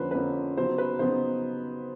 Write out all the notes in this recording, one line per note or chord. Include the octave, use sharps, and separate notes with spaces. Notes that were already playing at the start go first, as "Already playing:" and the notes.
Already playing: F2 D3 F3 A#3 C#4 B4 C5
F2 D3 F3 A#3 C#4 B4
C#3 F#3 B3 D#4 C5
B4
C#3 F#3 B3 D#4 C5